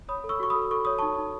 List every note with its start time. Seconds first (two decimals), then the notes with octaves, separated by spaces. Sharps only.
0.09 C#5 B5 D#6
0.24 A4
0.29 C#6 E6
0.40 F#4 C#6
0.50 B5 D#6
0.55 A4
0.71 A4 C#6
0.85 C#5 D#6
0.99 D#4 A5 C#6
1.18 D#4